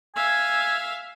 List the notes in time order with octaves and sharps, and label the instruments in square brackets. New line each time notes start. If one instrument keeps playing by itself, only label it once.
[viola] E5 F5 [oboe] G#5